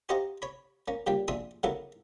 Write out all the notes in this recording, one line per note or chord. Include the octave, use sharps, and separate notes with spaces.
F#4 G4 C5 D#5 F5 A#5
C#5 B5
A#3 C#4
A#2 C#3 G3 D4 G5
A#1 D4 G#4 E5 C6 D#6
C#3 F#3 A#3 B3 E4 A4